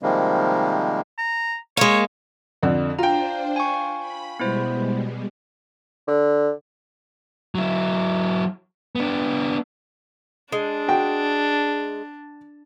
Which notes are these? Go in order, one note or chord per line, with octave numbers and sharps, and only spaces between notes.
C3 D#3 F3 G3 G#3 A#3
A#5
G#3 A#3 C#5
F2 D3
D4 F4 C5 G5 A#5
G#5 C#6
B5
B2 G3 G#3 B3 E4 C5
D3
F#3 E4
B3 D4
G#3 D4
F#4 G5